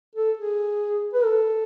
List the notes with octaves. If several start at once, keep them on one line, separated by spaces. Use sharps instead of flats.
A4
G#4
B4
A4